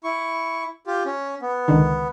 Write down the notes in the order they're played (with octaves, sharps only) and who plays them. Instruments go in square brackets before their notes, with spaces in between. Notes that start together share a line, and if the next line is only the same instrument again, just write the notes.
[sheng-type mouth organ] E4 C#6
F4 G4
C#4
B3
[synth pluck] C#2 D3 D#3